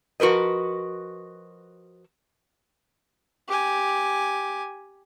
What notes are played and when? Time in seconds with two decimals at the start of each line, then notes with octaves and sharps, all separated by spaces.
0.20 F3 F#4 A#4 B4 D#5
3.48 G4 G#5